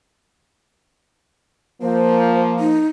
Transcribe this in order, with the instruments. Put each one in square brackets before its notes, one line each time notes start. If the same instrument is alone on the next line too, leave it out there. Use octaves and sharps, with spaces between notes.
[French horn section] F3 A#3 [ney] C5
[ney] D#4